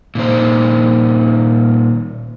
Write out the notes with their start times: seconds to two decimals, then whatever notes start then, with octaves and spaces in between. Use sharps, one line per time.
0.15 A#2 D#3 C5